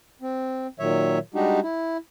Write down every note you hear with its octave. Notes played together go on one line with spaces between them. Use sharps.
C4
A#2 D#3 F#3 C#5 E5
G3 G#3 D4 D#4 F#4 G4
E4